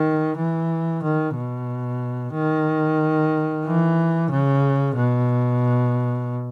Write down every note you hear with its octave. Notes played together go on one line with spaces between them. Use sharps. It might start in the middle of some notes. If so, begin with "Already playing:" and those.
Already playing: D#3
E3
D#3
B2
D#3
E3
C#3
B2